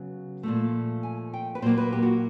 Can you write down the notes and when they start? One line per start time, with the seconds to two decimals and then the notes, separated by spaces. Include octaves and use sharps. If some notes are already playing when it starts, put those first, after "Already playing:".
Already playing: C#3 F#3 B3
0.43 A#2 F3 A3
1.03 G#5
1.34 G5
1.55 B4
1.62 A#2 F#3 A#3 C5
1.78 B4
1.92 G4
2.03 F#4